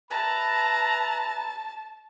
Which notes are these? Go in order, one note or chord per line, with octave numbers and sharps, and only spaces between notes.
B4 E5 A5 A#5